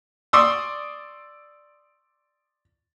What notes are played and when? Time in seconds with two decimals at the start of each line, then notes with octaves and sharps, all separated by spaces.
0.33 D5 C6 C#6 D#6 E6